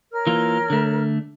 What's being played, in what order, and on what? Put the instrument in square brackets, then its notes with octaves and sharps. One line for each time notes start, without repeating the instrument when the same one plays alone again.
[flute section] A#4 C#5 F6
[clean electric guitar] E3 A#3 F4
D3 A3